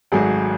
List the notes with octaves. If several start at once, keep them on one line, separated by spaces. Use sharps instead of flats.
G#1 G#2 F#3 A3 G#4